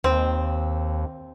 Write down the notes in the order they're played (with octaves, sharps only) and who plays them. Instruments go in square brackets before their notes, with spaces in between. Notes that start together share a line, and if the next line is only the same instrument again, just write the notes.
[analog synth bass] D#2 [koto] C4